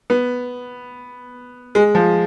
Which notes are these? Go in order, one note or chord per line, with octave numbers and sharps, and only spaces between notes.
B3
G#3
F3